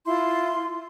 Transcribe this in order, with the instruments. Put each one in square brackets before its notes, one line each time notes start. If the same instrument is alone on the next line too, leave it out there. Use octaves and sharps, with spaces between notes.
[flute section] E4 F4 C6